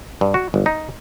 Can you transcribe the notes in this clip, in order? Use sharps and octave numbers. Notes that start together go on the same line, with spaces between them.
G2
F#4
G1
D#4